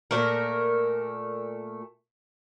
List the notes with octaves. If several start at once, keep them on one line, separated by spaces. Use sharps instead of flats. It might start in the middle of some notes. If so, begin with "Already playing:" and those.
A#2 A3 A#4